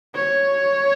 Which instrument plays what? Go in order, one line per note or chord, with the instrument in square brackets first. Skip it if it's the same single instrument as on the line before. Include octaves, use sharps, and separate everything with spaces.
[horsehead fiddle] C#5